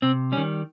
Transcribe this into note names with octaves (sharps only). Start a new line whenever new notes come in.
C3 C4
G3 C#4
D#3